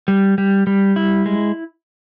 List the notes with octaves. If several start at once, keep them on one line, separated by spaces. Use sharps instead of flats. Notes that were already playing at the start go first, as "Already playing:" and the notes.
G3
G3
G3
E4
G#3